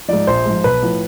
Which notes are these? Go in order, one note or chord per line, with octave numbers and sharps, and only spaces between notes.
G#2 F3 D5
A#1 C5
G#2 F3
B1 B4
A2 F3